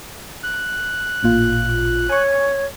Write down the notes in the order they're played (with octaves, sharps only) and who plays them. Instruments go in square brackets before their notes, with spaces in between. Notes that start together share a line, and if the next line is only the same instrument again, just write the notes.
[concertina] F#6
[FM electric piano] A1 A#2 F4
[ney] C#5 [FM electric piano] G#5 C#6